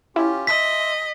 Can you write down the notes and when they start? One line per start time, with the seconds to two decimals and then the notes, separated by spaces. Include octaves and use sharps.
0.16 C#4 E4 F4 G4
0.47 D#5 E5 C6 E6 B6